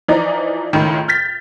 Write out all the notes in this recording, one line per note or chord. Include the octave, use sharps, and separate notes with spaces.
E3 F3 D#4 D5 A#5
C#2 A2 D#3
F6 G6 A6 B6